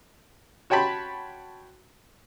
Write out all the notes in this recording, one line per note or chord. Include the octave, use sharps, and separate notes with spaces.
F#4 C#5 G5 A5 B5 C6